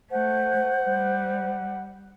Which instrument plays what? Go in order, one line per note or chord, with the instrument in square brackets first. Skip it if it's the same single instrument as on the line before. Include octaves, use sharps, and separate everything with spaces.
[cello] A3 [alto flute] C5 [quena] F#5
[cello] G3